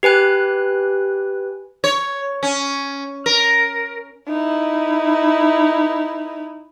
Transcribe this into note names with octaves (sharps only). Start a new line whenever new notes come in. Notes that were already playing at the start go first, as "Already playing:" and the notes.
G4 B4 G#5 F#6
C#5
C#4
A#4
D#4 E4